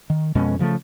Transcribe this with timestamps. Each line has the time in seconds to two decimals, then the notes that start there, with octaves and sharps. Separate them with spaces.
0.10 D#3
0.35 F2 B2 G#3 C#4
0.59 C#3 F3 F#3 A3